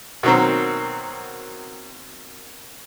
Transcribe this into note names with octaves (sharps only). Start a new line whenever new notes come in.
B2 D#3 F#3 A#3 C4